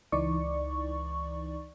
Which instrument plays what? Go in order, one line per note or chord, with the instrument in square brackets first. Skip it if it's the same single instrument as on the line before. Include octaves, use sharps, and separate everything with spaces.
[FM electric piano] C#2 E3 D#4 D5 C#6